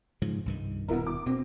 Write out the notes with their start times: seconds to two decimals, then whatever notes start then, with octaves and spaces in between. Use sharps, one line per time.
0.22 G#2 C#3 F3
0.46 C2 G2 D#3
0.88 D#1 B2 B3 E4 A#4
1.07 D6
1.26 B2 C4